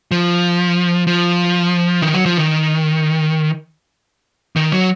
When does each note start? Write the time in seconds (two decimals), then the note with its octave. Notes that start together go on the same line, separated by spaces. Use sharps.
0.11 F3
1.07 F3
2.02 D#3
2.14 F#3
2.26 F3
2.38 D#3
4.56 D#3
4.72 F#3